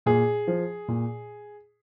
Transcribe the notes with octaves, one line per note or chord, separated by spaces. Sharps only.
A#2 G#4
F3
A#2